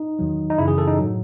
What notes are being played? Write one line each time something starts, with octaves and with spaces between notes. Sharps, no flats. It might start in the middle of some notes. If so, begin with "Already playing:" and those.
Already playing: D#4
E2 D#3 F#3
D#4
F#2 C#3 E3 E4
G#4
A4
D#4
A2 F#3